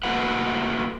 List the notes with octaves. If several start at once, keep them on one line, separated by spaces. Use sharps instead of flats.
A3 A#3 E4 F#4 B4 F#5